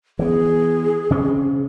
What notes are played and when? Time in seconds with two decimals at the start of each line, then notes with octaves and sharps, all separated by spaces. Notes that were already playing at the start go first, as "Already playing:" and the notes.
0.19 E3 B3 G#4
1.11 C#3 C4 C#4